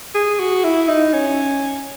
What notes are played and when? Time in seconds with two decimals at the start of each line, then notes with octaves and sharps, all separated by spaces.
0.15 G#4
0.40 F#4
0.64 E4
0.88 D#4
1.13 C#4